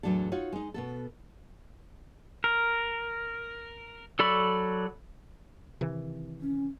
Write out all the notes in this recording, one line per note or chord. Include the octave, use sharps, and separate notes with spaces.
E2 A2 F#3 D4 A4
D#4 F4 F#4 C#5
G#3 D#4
B2 B3 A4
A#4
F#3 A4 D5 B5 C#6
C3 D#3 E3
C#4